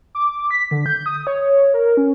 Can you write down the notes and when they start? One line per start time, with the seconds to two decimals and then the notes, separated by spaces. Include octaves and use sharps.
0.15 D6
0.51 B6
0.71 D3
0.86 G6
1.06 D#6
1.27 C#5
1.74 A#4
1.97 C#4